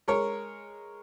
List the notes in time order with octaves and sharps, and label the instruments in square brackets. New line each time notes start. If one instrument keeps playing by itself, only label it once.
[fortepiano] G#3 A#4 C#5